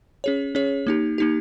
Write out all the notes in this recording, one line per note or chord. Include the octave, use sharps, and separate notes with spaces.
C#4 G#4 C#5
C#4 G#4 C#5
A#3 D#4 G4
A#3 D#4 G4